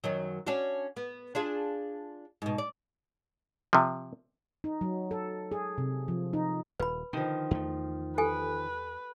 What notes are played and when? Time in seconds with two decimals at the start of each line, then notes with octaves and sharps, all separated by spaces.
0.04 F#2 D#3 F#3
0.47 C#4 D4 F#4
0.97 B3
1.35 D4 F4 G#4
2.42 G#2 B2
2.58 D5
3.73 C3 F3
4.64 D#4
4.81 F#3
5.11 A4
5.52 G#4
5.78 C3
6.08 F3
6.33 D#4
6.80 D#1 B4 B5
7.13 D3 D#3 F3
7.51 E2 A3
8.18 G4 A4 B4 G#5